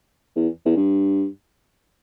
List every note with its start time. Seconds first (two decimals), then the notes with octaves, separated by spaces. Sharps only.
0.36 E2
0.65 E2
0.76 G2